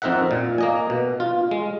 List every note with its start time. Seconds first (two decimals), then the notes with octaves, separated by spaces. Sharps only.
0.02 F2 C4 D#4 A#4 E5 F#5
0.31 A#2
0.58 A#3 D#5 G#5
0.90 B2
1.20 F4
1.51 G#3